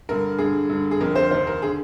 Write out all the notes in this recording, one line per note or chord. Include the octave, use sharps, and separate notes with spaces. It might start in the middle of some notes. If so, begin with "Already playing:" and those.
G2 D3 A#4
G2 D3 G#4
G2 D3
G#4
F2 D3 A#4
C5
D#2 D#3 C5
A#4
D3 G#4